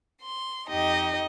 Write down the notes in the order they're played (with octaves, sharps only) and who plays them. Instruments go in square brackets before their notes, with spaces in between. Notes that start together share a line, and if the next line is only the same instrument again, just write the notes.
[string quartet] C6
F2 D#4 G4 D#5